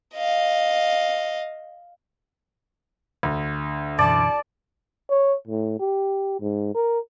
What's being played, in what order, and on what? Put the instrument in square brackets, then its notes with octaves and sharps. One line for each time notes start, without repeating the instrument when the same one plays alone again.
[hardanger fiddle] D#5 F5
[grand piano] D2
[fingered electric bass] F#2 B2 E3 [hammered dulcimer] D5 [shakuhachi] A5
[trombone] C#5
A2
G4
G#2
A#4